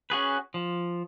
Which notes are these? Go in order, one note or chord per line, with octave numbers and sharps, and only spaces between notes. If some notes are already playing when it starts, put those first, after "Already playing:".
C#4 F#4 G#4 B4
F3